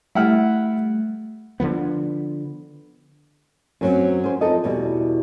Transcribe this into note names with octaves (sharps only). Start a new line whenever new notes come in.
G3 A3 E4 F#5 F6
D3 E3 F3 B3
F#2 F#3 C4
C#4 C5
F2 D#4 A4 D#5
E2 B2 G3